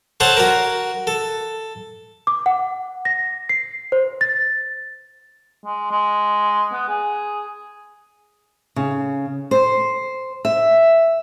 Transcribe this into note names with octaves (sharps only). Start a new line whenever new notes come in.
A4 C5 C#5 F#5 A5
F#4 A#4
A4
D6
F#5
A#6
C7
C5
A6
G#3
G#3
B3
G#4
C#3
C5
E5